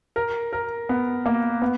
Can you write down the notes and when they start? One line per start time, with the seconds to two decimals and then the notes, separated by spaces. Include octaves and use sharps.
0.16 A#4
0.53 A#4
0.89 B3
1.26 A#3
1.62 B3